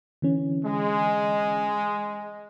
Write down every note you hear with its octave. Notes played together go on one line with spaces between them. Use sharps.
D3 E3 C#4
G#3